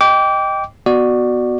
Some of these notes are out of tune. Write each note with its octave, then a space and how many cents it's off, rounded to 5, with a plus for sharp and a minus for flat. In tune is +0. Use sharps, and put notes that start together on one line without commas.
D#5 +0 G5 +0 D6 -25
B3 +0 F#4 +0 D5 +20